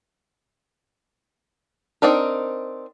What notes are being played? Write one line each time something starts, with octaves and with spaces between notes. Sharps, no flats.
C4 D4 D#4 A#4